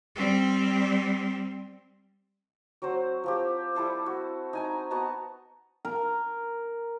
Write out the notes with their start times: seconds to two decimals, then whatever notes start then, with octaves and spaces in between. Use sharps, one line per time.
0.16 G3 C4
2.82 F#3 C4 F#4 C5
3.24 F3 C4 G4
3.75 G3 E4 A4 C5
4.06 F#4
4.53 D#4 G#5 A#5
4.91 B3 F#4 A5 A#5
5.85 A#4